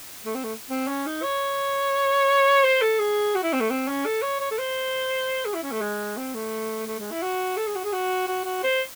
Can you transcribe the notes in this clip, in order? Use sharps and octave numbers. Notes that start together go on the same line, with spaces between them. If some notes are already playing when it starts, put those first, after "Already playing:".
A3
C4
A3
C4
C#4
D#4
C#5
C5
A4
G#4
F#4
E4
C4
A3
C4
C#4
A4
C#5
C#5
A4
C5
G#4
E4
C#4
A3
G#3
C4
A3
A3
G#3
E4
F#4
A4
G#4
F#4
G#4
F#4
F#4
F#4
C5